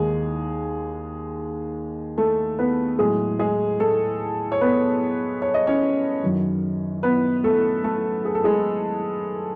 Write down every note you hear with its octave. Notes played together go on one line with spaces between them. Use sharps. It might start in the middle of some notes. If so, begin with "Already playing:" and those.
Already playing: D#2 D#3 G#3 G#4
A3 A4
B3 B4
A2 F#3 G#3 G#4
G#3 G#4
A3 A4
C#5
B3 B4
C#5
D#5
C#4 C#5
F#2 D#3 F#3
B3 B4
A3 A4
A3 A4
G#4
A4
G#3 G#4